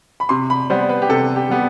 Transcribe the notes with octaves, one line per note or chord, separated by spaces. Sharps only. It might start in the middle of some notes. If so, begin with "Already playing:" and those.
B5
C3 C6
B5
G3 B3 C5
B4
G4
C3 A4
G4
G3 B3 G4